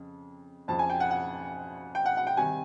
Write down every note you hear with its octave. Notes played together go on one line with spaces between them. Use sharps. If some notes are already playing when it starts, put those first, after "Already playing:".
Already playing: F2 C#3
F2 C#3 F3 A5
G#5
G5
F#5
F#5
G5
F#5
F#5
G5
C3 D#3 G3 G#5